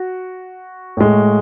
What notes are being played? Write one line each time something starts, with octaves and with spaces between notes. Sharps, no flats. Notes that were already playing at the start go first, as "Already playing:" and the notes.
Already playing: F#4
A2 G#3